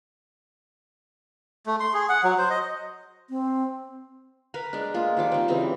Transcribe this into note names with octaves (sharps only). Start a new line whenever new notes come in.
A3
C6
G#4
F#5
F#3
C5
D#5
C4
A#4 B4 B5
G#3 D4
G#3 A#3 F4
D#3 F3 G3 D6
C4 D#4
C#3 E3 G3 C4